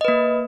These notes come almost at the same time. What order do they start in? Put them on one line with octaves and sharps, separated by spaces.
D#5 B4 A#3